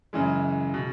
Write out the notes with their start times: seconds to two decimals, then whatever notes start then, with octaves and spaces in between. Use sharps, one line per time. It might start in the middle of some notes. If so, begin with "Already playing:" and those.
0.13 F#2 C#3 E3 G#3
0.74 B2